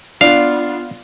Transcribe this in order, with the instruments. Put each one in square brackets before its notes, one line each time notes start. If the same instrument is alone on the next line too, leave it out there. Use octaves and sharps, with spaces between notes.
[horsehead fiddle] B3 F4 [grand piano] D4 [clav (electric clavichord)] F5